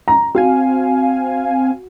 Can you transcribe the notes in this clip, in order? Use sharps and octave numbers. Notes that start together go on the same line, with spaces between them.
A#5
C4 F#4 F5 G#5